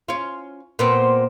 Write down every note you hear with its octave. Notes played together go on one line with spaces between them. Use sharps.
C#4 F4
A#2 B3 C4